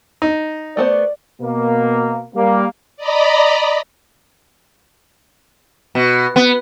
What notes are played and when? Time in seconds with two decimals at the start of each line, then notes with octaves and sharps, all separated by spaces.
0.22 D#4
0.77 A3 B3 C5 D5
1.41 B2 A#3
2.35 G3 A#3
2.97 D5 D#5 A#5 B5
5.95 B2
6.36 B3